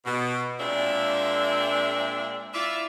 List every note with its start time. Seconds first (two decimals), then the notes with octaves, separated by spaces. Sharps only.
0.05 B2
0.60 A#2 G#3 A#3 C4 D4 E5
2.54 E4 F4 D5 E5